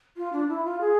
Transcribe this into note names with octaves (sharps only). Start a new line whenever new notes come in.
F4
D4
E4
F4
G#4